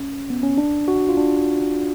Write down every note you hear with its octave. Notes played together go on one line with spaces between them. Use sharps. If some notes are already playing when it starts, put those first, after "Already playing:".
Already playing: C#4
B3
C#4
D4
F#4
F4
D4